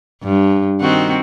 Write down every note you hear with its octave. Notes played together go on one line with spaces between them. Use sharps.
G2
D#3 C4 F#4